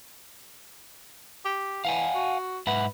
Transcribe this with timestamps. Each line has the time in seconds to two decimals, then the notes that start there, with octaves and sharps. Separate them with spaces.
1.45 G4
1.85 E3 F5 F#5 G#5
2.15 F#4
2.67 G#2 B4 E5 F#5